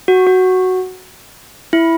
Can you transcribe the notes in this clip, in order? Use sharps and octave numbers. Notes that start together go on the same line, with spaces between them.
F#4
F#4
E4